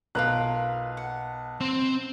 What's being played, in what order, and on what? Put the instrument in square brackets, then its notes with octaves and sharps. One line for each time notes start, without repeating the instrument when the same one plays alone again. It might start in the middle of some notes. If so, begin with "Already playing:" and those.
[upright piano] B1 B4 F#6 [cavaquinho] F4 A#4 A#5
[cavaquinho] F#5
[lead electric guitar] C4